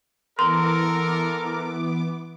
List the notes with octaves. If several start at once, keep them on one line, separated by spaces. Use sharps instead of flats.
E3 B3 A4 A#4 C6 D6